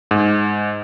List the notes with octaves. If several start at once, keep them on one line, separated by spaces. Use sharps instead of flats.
G#2